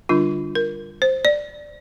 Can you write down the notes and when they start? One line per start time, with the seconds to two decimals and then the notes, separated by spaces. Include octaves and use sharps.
0.09 D3 G3 D4 F4
0.55 A#4
1.02 C5
1.25 D5